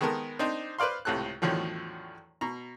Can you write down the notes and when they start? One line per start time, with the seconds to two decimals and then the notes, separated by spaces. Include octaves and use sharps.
0.01 D#3 G#3 B3 A4 A#4
0.39 C4 D4 D#4
0.79 B4 C5 D5 F5 C6
1.05 C#2 A2 C3 A4 F#6
1.42 E2 A2 D3 D#3 F3 F#3
2.41 B2 A#5